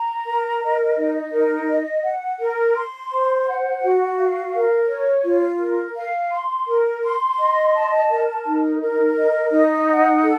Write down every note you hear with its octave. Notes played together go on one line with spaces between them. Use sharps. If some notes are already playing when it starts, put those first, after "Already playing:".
Already playing: A#5
A#4
D#5
D#4
A#4
D#5
F#5
A#4
C6
C5
F#5
F#4
F5
A#4
C#5
F4
A#4
F5
C6
A#4
C6
D#5
A5
A#4
D#4
A#4
D#5
D#4
F#5
A4